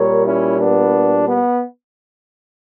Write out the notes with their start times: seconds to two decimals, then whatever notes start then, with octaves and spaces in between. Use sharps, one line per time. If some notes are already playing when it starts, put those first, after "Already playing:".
Already playing: A#2 G3 A#4 C#5
0.26 C#4 E4
0.60 B3 D4
1.28 B3